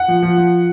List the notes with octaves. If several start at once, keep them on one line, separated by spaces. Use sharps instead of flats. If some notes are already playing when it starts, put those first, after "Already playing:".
Already playing: F#5
F3
F3
F3